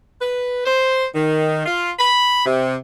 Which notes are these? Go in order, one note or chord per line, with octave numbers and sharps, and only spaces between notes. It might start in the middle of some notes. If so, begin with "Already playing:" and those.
B4
C5
D#3
F4
B5
C3